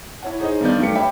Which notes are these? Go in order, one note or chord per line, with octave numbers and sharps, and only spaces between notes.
E4 C#5 F#5
D#4 G#4 C5 C#5 D#5
G2 D#3 B3 D5 G6
G2 F#3 A3 G4 B4 C#7
G4 C#5 D#5 E5 G5 B5